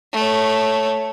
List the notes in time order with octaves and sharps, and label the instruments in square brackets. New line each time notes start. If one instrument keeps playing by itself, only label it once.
[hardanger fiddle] A3 C#5